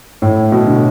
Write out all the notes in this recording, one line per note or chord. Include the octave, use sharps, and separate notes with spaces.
A2
B2
D3